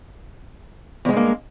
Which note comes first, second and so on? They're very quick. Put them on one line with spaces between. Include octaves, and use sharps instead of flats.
E2 G#3 G2 A#3